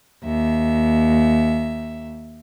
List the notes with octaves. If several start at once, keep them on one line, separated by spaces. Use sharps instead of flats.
D#2 E5